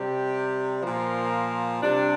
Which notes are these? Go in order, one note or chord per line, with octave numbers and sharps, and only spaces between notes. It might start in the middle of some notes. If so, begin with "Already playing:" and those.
Already playing: C3 G3 G4
A#2 F3 A#4
C3 G3 D4